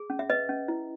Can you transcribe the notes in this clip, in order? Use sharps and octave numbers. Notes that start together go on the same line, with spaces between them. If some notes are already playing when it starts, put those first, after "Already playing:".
Already playing: G#4
C#4
E5
B4 D#5
C#4
E4